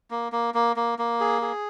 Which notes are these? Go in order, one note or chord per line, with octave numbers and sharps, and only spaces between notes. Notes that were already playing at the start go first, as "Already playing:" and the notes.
A#3
A#3
A#3
A#3
A#3
G#4
G#4